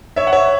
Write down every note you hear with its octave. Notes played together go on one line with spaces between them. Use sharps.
C#5 E5
F#5
C#5 E5